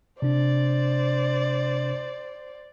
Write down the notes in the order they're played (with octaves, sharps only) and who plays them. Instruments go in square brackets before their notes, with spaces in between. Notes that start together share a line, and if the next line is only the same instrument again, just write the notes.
[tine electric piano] C3 D4 [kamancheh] C5 D5